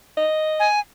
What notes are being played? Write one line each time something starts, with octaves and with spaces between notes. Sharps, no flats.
D#5
G#5